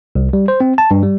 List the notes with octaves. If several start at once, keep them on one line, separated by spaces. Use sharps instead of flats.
C2
G3
C5
C4
A5
G2
G3